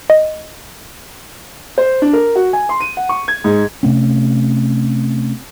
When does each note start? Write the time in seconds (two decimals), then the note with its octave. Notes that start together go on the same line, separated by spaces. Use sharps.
0.10 D#5
1.78 C5
2.02 D4
2.13 A#4
2.35 F#4
2.53 G#5
2.69 C6
2.80 D#7
2.97 F#5
3.09 C#6
3.28 G#6
3.44 G#2
3.83 C3 A3 C#4